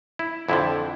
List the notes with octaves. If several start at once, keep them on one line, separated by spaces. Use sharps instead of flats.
E4
F2 D3 F3 E4